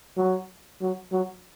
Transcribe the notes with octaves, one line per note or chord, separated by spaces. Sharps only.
F#3
F#3
F#3